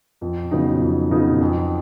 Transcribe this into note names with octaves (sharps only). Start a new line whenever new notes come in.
F2
C#3 F#3 B3 D#4
F2
C#3 F#3 B3 D#4
F2